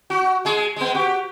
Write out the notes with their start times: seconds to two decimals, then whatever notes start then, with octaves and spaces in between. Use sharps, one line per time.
0.10 F#4
0.45 G#3 G#4
0.76 G#3 B3
0.94 F#4 G4